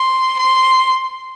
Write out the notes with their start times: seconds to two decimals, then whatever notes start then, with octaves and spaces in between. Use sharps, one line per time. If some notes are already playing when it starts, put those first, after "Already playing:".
Already playing: C6
0.39 C6